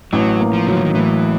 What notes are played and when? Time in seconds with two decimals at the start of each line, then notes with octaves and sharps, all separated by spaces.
0.13 A1 F#3
0.40 A#3
0.53 F3
0.66 C#3 F#3
0.76 D3
0.85 D#3
0.94 A2 E3